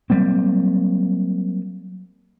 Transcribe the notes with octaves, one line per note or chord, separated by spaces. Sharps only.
F#3 G3 A#3 C4